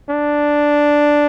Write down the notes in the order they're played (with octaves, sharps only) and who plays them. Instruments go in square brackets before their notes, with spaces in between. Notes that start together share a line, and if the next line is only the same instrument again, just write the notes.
[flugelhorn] D4